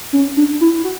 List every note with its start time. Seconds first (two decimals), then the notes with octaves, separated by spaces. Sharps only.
0.13 C#4
0.37 D4
0.61 E4
0.84 F#4